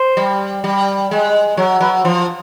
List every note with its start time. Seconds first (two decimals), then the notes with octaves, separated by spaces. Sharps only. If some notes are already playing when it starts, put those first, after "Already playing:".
Already playing: C5
0.17 G3
0.64 G3
1.11 G#3
1.57 F#3 C#5
1.81 F#3 B4
2.04 F3 C5